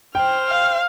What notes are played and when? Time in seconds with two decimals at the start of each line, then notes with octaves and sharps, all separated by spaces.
0.15 C5 G5 F6
0.50 F5